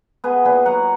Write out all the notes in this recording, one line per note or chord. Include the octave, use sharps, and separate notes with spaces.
B3 G#4 B4
A#2 G#4 B4
F#3 F#5 A#5